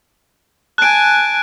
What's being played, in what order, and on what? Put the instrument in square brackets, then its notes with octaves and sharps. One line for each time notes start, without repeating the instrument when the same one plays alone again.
[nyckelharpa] G#5 A5 [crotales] F#6 D7